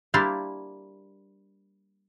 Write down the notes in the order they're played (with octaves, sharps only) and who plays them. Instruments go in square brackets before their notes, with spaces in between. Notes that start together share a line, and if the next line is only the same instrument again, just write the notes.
[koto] G3 A#3 D4 E4 C5 F5